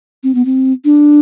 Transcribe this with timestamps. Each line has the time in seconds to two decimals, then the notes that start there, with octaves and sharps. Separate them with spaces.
0.24 C4
0.35 B3
0.45 C4
0.85 D4